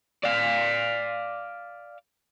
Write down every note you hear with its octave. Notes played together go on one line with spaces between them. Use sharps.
D5 F5